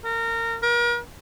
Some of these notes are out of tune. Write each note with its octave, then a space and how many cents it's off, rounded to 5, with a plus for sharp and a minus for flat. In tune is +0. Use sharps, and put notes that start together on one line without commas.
A#4 -25
A#4 +40